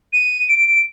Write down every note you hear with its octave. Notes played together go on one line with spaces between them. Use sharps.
D#7
D7